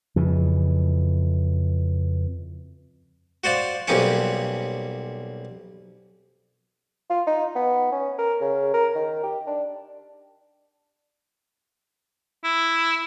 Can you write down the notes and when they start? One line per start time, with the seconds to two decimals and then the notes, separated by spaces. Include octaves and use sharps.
0.16 F2 C#3 E3
3.44 F#4 C5 D5 F5
3.88 B1 G3 A#3 C4 C#4 C#5
7.10 F4
7.27 D#4
7.56 B3
7.92 C#4
8.18 A#4
8.41 C#3
8.74 A#4
8.95 D#3
9.23 G4
9.47 D4
12.44 E4